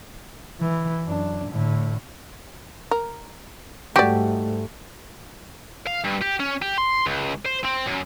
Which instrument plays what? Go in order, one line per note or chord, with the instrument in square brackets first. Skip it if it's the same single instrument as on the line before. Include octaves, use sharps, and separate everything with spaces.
[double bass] E3
F#2 D4
A2 D3
[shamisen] A#4
[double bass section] G#2 G3 A3 [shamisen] F#4 D5 [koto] G4
[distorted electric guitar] F5
G2
G4
C#4
G4
C6
C#2
C5
C4
F#2